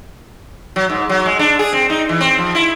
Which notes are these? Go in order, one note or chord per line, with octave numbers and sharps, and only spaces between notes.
F#3
G#2
F#3
G#3
D4
G#4
C4
D#4
E3
C4
F3
E4